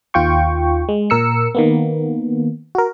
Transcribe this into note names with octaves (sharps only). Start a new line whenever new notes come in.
D#2 D#3 F4 G5 C#6
G#3
A#2 A#4 E6 C#7
D#3 A#3 B3
F#4 A#4